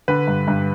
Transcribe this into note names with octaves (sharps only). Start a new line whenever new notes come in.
D3 B4
G2
G2